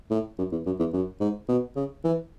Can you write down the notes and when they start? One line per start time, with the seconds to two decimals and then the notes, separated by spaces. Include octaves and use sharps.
0.11 A2
0.38 F#2
0.52 E2
0.66 F#2
0.79 E2
0.93 F#2
1.20 G#2
1.48 B2
1.76 C#3
2.04 E3